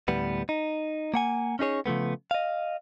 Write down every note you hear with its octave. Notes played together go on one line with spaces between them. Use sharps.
D2 A2 G3 B3 B4
D#4
A#3 F#5 G#5
C#4 D#4 G#4 C#5
C#3 F3 A3 B3
D#5 F5